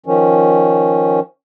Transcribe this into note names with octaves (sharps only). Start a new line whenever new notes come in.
D#3 F3 C#4